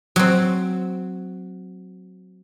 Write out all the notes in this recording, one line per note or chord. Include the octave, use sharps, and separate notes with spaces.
F#3 C4